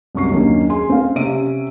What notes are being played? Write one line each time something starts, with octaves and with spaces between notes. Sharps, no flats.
C2 F#2 C#6 C7
D#2 D#3 F#3 A#3 C#4 D4
G#4 G#5 C6
C4 F5
C3 C#4 E5 D7 D#7